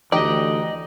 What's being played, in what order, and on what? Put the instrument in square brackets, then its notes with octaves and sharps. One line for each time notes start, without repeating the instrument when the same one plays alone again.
[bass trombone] D2 [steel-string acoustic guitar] E3 [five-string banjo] D#4 G4 [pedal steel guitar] D5 D#5